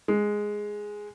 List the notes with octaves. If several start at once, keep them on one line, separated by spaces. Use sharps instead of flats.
G#3